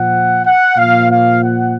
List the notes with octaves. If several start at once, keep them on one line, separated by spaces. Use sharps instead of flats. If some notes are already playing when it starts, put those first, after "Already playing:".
Already playing: A#2 F3 F#5
F#5
A#2 F3 F5
F5
F#5